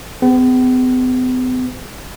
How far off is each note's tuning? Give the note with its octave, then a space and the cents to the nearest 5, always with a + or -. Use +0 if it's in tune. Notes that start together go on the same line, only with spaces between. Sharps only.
B3 +45 G#4 -25